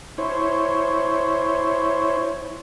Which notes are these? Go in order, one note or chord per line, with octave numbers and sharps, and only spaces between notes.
E4 C5 C#5